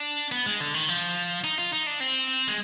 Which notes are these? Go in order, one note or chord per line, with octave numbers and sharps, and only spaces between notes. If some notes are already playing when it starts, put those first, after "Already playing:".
Already playing: D4
B3
G#3
D3
D#3
F3
D#4
F4
D#4
D4
C4
G#3